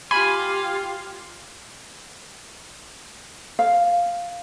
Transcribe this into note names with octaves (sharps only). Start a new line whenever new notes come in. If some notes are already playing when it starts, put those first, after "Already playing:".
F4 G4 F5 G#5 B5
F5